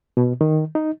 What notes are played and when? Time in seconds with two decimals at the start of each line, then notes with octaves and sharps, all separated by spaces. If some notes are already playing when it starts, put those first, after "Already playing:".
0.17 B2
0.41 D#3
0.75 D#4